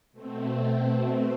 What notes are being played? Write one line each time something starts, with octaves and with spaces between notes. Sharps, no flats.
B2 A3 C4